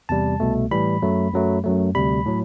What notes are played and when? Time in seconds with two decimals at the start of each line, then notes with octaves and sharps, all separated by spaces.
0.09 E2 C3 G3 A5
0.40 C2 B2 A3
0.71 A2 E3 G3 B5
1.02 F#2 F#3 A3
1.33 F#2 F#3 A3
1.64 F#2 F#3 A3
1.95 D2 C3 G3 B5
2.26 A2 F#3